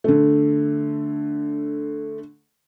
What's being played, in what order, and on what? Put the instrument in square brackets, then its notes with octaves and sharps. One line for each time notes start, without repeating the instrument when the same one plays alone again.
[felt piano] D3 A3